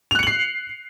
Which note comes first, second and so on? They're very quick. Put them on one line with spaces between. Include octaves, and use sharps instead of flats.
F7 F#6 C#7 F#7 C7